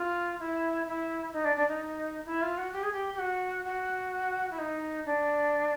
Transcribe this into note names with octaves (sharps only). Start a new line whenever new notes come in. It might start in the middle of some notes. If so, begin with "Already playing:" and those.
Already playing: F4
E4
E4
D#4
D4
D4
D#4
E4
F4
F#4
G4
G#4
G4
G4
F#4
F#4
E4
D#4
D4